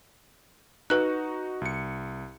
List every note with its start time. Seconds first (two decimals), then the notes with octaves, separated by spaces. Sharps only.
0.90 D#4 F#4 B4 F#6
1.61 C2 C#7